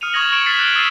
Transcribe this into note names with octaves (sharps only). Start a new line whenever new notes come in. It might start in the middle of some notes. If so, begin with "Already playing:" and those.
D#6 F6 C#7 D#7 F7
C#6 D#6 G#6 A#6 F#7
C#6 G#6 C#7 D7 E7 F#7
F6 G#6 A6 B6 C7 E7
F#6 G#6 D7 F#7 G7
D#6 E6 A6 B6 C7 D#7